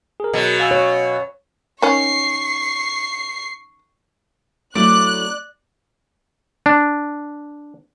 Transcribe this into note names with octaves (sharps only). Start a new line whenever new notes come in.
G#4 A#4
B2 F#3
F5 G#5 E6
C#5
D#3 C#4 C#6 C7
F#3 A3 E4 D5 F#6
D4